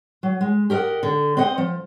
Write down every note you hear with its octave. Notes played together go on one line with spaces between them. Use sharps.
F#3
G#3
G4 A#4 C#5 D#5 F#5
D3
C4 B4 D#5 F#5
F3